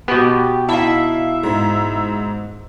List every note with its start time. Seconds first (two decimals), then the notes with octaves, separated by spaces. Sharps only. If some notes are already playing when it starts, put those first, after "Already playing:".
0.08 B2 B3 G4
0.69 D#4 E4 E5 F5 A5
1.43 G#2